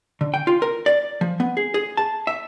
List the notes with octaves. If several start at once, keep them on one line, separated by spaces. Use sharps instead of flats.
D3
G5
F4
A#4
D5
F3
B3
G#4
G#4
A5
E5